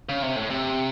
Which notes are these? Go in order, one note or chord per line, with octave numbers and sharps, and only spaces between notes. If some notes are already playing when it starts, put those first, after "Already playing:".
C#3
C3
A2
C3